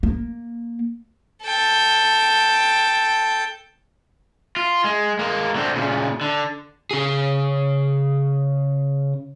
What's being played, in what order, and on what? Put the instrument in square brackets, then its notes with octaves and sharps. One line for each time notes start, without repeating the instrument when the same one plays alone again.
[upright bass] A#3
[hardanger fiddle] A4 G5
[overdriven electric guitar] F4
G#3
G#3 A#3
D3 C4
A#2 C#3
D3
C#3 G#4